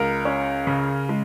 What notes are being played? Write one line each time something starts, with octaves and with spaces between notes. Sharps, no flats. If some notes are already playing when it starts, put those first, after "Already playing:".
Already playing: C#2 A#4
C#4
C#3
G#3